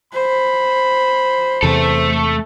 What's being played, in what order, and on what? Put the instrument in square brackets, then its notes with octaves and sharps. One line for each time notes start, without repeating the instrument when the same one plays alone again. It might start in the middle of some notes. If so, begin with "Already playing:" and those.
[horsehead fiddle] C5 [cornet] B5
[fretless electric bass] E2 C3 [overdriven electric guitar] A3 A4